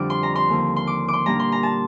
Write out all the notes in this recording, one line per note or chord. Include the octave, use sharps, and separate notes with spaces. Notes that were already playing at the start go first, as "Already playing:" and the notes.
Already playing: F2 D3 G3 D4 D6
C6
A#5
C6
D#2 D3 F3
C6
D6
C6 D6
A#2 G3 D4 A#5
C6
A#5
A5